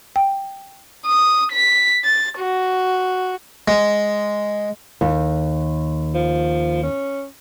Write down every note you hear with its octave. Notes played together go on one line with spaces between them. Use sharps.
G5
D#6
B6
A6
F#4
G#3
D#2
F3
C#4